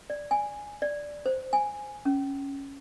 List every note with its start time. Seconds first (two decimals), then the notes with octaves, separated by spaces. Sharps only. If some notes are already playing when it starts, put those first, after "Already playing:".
0.10 D5
0.31 G#5
0.82 D5
1.26 C5
1.53 G#5
2.05 C#4